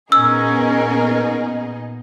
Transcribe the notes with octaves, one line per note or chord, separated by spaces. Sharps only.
A#2 B3 C#4 D#4 G#4 A#4 D#5 E6